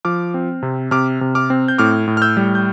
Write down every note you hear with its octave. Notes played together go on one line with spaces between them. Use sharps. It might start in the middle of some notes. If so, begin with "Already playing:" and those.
F3 D6 F6
C4
C3
C3 D6 F6
C3
D6 F6
C4
G6
A2 D6 F6
A2
F6
E6 G6
G3
G6